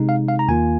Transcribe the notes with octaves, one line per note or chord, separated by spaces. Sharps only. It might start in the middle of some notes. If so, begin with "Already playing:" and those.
Already playing: C3 G#3 D#4
F5
F5
A#5
D#2 D#3 A#3 F4 G#5